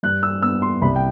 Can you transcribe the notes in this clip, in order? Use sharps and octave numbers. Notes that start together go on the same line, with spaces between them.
G2 F#6
E6
B3 E6
C6
C2 B5
G5